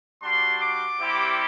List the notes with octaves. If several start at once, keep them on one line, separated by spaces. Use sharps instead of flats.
G3 D4 F#4 C6
D6
G3 C4 E4 G4